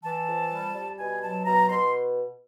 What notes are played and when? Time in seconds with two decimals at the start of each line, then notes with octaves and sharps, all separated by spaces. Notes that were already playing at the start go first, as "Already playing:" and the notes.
0.03 E3 A5
0.27 F2
0.51 G3
0.74 G3
0.98 B2 G#5
1.21 F#3 A5
1.45 B2 A#5
1.69 B2 C6